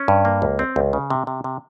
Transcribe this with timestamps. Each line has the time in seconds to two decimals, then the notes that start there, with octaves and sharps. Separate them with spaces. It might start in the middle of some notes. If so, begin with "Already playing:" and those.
Already playing: C#4
0.08 G2
0.25 A#3
0.42 C#2
0.59 C4
0.76 C#2
0.93 C#3
1.10 C3
1.27 C3
1.44 C3